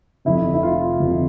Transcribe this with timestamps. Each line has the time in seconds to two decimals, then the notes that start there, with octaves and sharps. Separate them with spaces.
0.25 F1 F2 C3 E4
0.54 E4
0.63 F4
0.99 F1 F2 C3